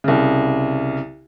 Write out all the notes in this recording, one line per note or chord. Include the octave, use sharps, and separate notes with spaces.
C2 C#3